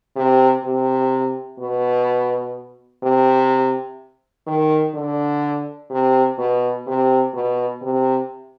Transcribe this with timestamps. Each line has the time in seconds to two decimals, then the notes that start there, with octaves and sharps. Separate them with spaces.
0.16 C3
0.64 C3
1.59 B2
3.03 C3
4.47 D#3
4.94 D3
5.90 C3
6.38 B2
6.86 C3
7.34 B2
7.82 C3